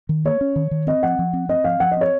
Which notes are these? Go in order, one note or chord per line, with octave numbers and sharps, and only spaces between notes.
D#3
A#3 C#5
C#4
D#3
D#3
C4 D#5
F3 F#5
F3
C4
C4 D#5
F3 F5
F3 F#5
D#5
C4 C#5